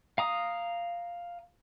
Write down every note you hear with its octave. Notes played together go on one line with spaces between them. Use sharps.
F5 A#5 D#6